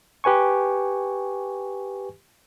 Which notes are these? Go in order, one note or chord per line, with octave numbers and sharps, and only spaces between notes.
G4 B4 G#5 C#6